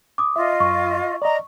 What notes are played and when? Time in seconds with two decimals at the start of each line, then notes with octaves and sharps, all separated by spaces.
0.18 D6 D#6
0.36 F4 D#5 E5
0.60 F#2 C#6
1.22 D5 D#5 A#5